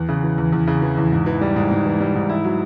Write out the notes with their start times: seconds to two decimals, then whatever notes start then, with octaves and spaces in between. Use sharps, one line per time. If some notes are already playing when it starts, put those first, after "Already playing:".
Already playing: E2
0.09 C#3
0.23 E3
0.38 E2
0.52 E2
0.67 C#3
0.82 E3
0.97 E2
1.12 G#2
1.26 E3
1.41 G3
1.56 G#2
1.71 G#2
1.85 E3
2.00 G3
2.15 G#2
2.29 E4
2.44 F#3